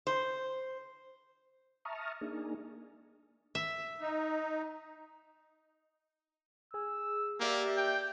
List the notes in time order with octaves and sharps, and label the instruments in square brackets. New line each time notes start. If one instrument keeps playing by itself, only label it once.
[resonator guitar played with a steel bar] C5
[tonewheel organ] E5 A5 A#5 C#6 D#6 F6
A#3 D4 D#4 G#4
[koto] E5
[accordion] D#4
[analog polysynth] G#4 [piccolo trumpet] E6
[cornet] A#3 [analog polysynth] G4 D5 E5
[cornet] G5 [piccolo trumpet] G6